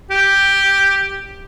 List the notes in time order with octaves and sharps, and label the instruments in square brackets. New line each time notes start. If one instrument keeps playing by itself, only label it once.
[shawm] G4